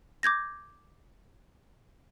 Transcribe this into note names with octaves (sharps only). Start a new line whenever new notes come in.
D6 G6 G#6 A#6